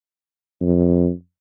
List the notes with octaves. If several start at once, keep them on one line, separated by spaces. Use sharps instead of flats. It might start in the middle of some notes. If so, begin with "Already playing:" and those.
F2